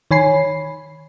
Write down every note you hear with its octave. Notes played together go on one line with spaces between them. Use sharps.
D#3 C#5 G#5 B5 C7